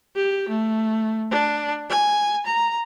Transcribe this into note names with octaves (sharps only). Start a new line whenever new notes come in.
G4
A3
D4
G#5
A#5